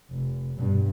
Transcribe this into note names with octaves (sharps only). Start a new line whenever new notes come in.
F1
G2 B2